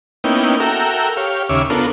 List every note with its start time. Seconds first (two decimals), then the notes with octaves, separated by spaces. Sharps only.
0.24 A#3 B3 C#4 D#4 E4 G5
0.60 F#4 A4 A#4 E5 G5 A#5
1.17 G4 C#5 F5
1.49 D#2 C#3 C#5 E5 D6
1.70 B3 D4 F4 A4 A#4